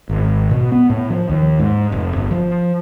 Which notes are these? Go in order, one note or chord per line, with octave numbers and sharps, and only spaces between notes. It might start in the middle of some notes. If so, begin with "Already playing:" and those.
G#1
B2
B3
A2
F3
D#2
G#2
F1
G1
F3